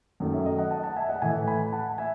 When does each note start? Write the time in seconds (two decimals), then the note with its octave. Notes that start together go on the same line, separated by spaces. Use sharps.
0.20 F#2 D#3 A3
0.32 C#5 E5
0.45 D#5
0.58 D#5 F#5
0.71 F#5 A5
0.83 F#5 A5
0.96 E5 G#5
1.09 D#5 F#5
1.22 A2 E3 A3 E5 G#5
1.47 G#5 B5
1.72 F#5 A5
1.98 E5 G#5